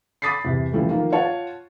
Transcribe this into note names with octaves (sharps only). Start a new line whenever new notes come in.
B5 D6 D#6 A6 B6 C7
E2 C3 G4
C#3 E3 F3 G3 A3
D#3 F3 A#3 F4
F4 C#5 F#5 A5